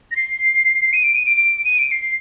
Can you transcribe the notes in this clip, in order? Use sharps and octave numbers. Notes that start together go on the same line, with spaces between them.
A#6
C7
D#7
D7
D#7
D7
D7
D#7
D7
C7